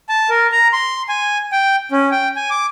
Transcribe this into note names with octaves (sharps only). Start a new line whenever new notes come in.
A5
A#4
A#5
C6
G#5
G5
C#4
G5
G#5
D6